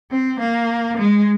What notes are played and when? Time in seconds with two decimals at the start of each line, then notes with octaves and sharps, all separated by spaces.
0.11 C4
0.40 A#3
0.97 G#3